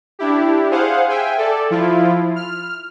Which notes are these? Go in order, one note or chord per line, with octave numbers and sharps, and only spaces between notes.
D4 E4 G4
G#4 C5 F5 F#5
E5 G5 G#5
A4 D5
F3 E4 F4
F6